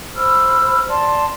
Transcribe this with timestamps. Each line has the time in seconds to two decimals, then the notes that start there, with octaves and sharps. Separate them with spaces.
0.15 C5 B5 E6 F6
0.88 D5 A5 C6